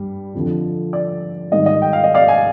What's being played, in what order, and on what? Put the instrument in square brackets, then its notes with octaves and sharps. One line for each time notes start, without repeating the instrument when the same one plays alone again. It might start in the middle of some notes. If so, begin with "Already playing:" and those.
Already playing: [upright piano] G2 G3
F2 D3 F3
D5
G#2 D#3 G3 D#5
D#5
G5
F5
D#5
D5 F5
G#5